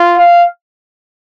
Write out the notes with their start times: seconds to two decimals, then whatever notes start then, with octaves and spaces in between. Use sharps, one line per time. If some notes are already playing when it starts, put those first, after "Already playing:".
Already playing: F4
0.17 F5